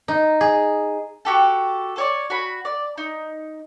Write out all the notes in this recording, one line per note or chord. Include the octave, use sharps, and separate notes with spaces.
D#4
G#4
F#4 G4 A4
A4 C#5 D5
F#4 B5
D5
D#4